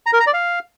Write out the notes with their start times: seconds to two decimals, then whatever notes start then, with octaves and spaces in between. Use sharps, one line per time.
0.06 A#5
0.13 A#4
0.20 A#5
0.27 D5
0.34 F5